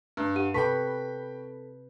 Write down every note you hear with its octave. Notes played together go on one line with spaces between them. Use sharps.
G2
G4 F#5 D#7
C3 A4 B4 G5 A5 B5 C#6 B6